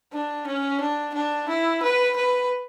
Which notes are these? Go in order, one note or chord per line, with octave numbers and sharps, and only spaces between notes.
D4
C#4
D4
D4
E4
B4
B4